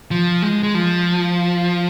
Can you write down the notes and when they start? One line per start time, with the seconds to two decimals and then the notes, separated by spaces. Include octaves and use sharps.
0.11 F3
0.42 G#3
0.63 G#3
0.75 F3